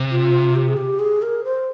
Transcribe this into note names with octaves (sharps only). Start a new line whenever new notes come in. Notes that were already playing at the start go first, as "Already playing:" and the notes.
Already playing: C3
F4
G4
G#4
G4
G#4
A#4
C5